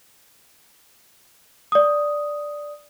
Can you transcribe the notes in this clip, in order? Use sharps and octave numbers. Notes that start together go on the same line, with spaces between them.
D5 D#6